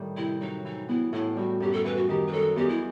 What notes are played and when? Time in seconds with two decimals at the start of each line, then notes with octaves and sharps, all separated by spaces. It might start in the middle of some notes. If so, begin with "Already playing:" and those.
Already playing: A2 D#3 G3 A3
0.16 C3 E4
0.41 F#3 D#4
0.65 E3 D#4
0.88 B3 E4
1.13 A2 E4
1.36 G3 F#4
1.60 F#2 G4
1.72 A4
1.84 E3 B4
1.96 F#4
2.08 D#3 G4
2.27 B4
2.32 F#3 A4
2.56 E2 G4
2.68 E4